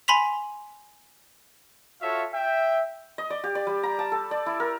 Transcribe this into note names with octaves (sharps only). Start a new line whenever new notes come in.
G#5 B5 C6 B6 F7
F4 F#4 A4 C#5 E5 F5
E5 G5
D#5
D5
G4
D5
G3
A#5
A5
A4
D5
E4
A#4